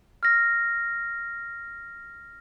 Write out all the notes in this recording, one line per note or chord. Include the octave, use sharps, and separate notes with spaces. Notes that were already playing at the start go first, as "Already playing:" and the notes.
F6 A#6